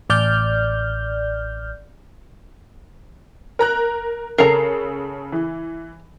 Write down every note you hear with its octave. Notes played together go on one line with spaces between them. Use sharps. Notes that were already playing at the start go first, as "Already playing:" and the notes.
A1 D5 F6 G6
A#4 A#5 F#6
C#3 A4 A#4 A#5 C7
E3